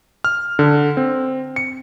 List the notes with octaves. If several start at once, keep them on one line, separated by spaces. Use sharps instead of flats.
F6
D3
C4
C#7